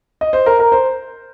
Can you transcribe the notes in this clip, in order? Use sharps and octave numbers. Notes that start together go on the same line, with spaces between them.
D#5
C5
A#4
A#4
C5